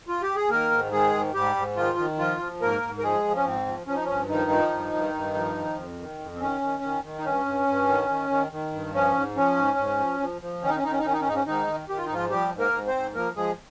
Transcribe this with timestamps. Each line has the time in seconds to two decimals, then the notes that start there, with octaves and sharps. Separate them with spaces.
0.08 F4
0.22 G4
0.36 G#4
0.49 D#3 A#3 A#4
0.71 G#2
0.92 D#3 G#3 G#4
1.14 G#2
1.34 G#2 G3 G4
1.56 G#2
1.76 D#3 F3 F4
1.98 D#3
2.19 F3 F4
2.39 F3
2.61 G#2 A#3 A#4
2.83 G#2
2.99 A#4
3.03 F3 G#3 G#4
3.24 F3
3.36 C#4
3.45 G#2 C4
3.67 F3
3.87 F3 C#4
3.95 D#4
4.04 G2 C#4
4.29 D#3 F3 D#4
4.51 F3
4.71 G2
4.93 G2
5.14 G2
5.34 F3
5.56 D#3
5.77 F2
5.99 D#3
6.19 F2
6.35 C4
6.40 D#3 C#4
6.61 D#3
6.83 D#3
7.04 D#3
7.18 D#4
7.25 G2 C#4
7.45 G2
7.67 G2
7.88 D#3
8.09 D#3
8.30 D#3
8.52 D#3
8.72 G2
8.94 F3 C#4
9.14 G#2
9.36 F3 C#4
9.56 G#2
9.78 G#2
10.00 F3
10.20 F3
10.42 F3
10.62 D#3 C#4
10.69 D#4
10.76 C#4
10.83 D#3 D#4
10.92 C#4
10.99 D#4
11.04 D#3 C#4
11.13 D#4
11.21 C#4
11.26 G#2 D#4
11.35 C#4
11.46 G#2 D#3 D#4
11.67 D#3
11.89 D#3 G4
11.97 F4
12.06 D#4
12.09 G#2 F3 F4
12.30 F3 G3 G4
12.52 G#2
12.59 A#3 A#4
12.72 G#2
12.87 C4 C5
12.95 G#2
13.15 F3 A#3 A#4
13.36 F3 G#3 G#4